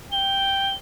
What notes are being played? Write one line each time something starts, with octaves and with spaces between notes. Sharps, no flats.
G5 G7